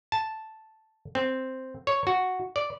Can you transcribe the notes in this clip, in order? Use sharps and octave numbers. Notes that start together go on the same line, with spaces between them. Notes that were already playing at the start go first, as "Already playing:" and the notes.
A5
C4
C#5
F#4
D5